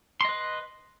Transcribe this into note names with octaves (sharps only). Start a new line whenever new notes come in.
B4 D#5 C6